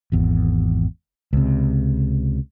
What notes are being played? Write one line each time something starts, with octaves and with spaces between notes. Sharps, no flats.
G#1 E2
C#2 C3